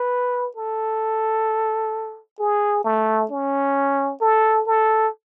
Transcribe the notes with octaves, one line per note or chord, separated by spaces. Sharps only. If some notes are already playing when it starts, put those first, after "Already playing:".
Already playing: B4
A4
G#4
A3
C#4
A4
A4